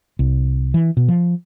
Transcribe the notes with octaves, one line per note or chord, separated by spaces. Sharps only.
C2
E3
B2
F3